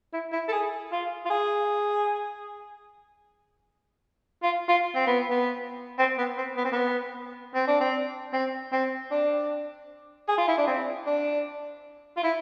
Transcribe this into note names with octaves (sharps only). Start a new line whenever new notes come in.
E4
E4
A4
G#4
F4
F4
G#4
F4
F4
C4
B3
B3
C4
B3
C4
B3
C4
B3
C4
D4
C4
C4
C4
D4
G#4
F4
E4
D4
C4
D4
F4
E4